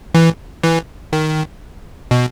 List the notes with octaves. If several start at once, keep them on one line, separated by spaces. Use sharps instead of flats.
E3
E3
D#3
B2